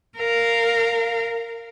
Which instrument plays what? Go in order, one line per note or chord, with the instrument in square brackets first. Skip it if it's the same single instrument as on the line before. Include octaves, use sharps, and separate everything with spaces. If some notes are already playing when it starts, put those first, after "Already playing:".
[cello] A#4 F5